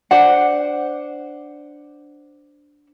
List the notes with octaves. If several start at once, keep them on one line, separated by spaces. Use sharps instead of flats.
D4 C5 F#5